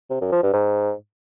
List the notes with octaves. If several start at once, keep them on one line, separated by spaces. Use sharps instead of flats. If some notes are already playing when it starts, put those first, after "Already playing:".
C3
F#2
F3
G2
G#2